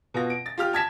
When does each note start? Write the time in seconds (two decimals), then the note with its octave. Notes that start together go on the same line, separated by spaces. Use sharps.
0.14 B2 F4 A#6
0.30 D7
0.46 A6
0.58 F4 G4 F6
0.73 A5 G#6 B6 E7